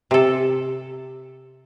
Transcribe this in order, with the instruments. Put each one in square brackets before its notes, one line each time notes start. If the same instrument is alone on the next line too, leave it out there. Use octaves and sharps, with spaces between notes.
[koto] C3 A4